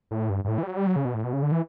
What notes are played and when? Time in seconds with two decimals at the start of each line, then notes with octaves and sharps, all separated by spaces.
0.11 A2
0.30 G2
0.44 G2
0.48 A2
0.58 E3
0.63 G3
0.67 F#3
0.77 G3
0.87 F#3
0.96 C#3
1.05 B2
1.14 A2
1.24 B2
1.33 C#3
1.42 D3
1.52 E3